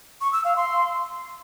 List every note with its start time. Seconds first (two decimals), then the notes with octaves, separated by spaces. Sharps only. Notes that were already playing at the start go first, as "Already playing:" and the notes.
0.21 C#6
0.33 E6
0.44 F5
0.56 C6